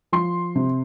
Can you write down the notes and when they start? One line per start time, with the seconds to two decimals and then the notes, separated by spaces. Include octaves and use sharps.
0.12 F3 C6
0.55 C3